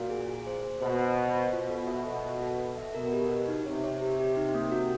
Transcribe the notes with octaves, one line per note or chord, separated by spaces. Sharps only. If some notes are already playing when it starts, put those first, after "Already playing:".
Already playing: A#2 F#4
G#4
G#4
C5
C5
B2 C5
C5
C5
C5
B2 F4
A4
E5
A4
A4
A4
A4
E5
B2 A#4
G4
G4
D#4
C3 C#5
C#5
G4
G4
D#4
A#3
F#4